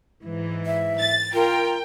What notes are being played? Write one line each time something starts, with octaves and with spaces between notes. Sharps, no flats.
G#2 E3
E5
A6
F4 A#4 G5